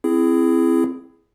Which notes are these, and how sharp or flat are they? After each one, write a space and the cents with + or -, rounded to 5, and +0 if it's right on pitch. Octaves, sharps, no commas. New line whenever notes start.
C4 +0 E4 +20 G#4 +0